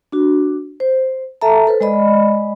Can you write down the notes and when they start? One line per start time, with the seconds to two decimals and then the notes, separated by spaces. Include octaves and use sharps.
0.12 D4 F#4
0.80 C5
1.42 A4 E5 A5 A#5
1.67 A4 B4 C5
1.81 G#3 D5 D#5 B5